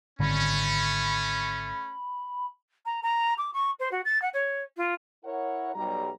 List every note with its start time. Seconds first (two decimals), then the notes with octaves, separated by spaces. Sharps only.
0.20 G#1 D3 A3 C#4 B5
2.85 A#5
3.02 A#5
3.37 D6
3.53 C#6
3.79 C5
3.91 F#4
4.05 A6
4.21 F#5
4.33 C#5
4.76 F4
5.25 E4 A#4 C#5 F#5
5.75 B1 G3 A#5